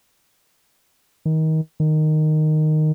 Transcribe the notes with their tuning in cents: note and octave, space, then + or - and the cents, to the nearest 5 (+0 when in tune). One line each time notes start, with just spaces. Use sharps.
D#3 +25
D#3 -10